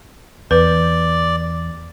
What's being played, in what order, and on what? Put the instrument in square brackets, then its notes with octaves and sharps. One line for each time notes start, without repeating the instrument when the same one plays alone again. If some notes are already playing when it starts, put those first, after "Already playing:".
[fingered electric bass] E2 [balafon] B4 [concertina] D5